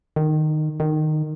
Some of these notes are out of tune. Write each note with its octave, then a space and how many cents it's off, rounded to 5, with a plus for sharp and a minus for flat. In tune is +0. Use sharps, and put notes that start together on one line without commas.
D#3 -15
D#3 -15